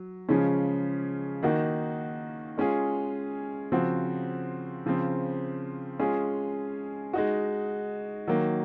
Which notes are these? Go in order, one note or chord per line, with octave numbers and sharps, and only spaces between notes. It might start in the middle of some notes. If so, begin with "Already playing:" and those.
Already playing: F#3
C#3 F3 G#3 C#4
D#3 A#3 D#4 F#4
G#3 C#4 F4 G#4
C#3 F3 C4 F#4
C#3 F3 C4
G#3 C#4 F4 G#4
G#3 D#4 F#4
D#3 F#3 A#3